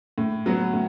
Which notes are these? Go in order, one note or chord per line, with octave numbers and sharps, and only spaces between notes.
A2
F#3 B3
A2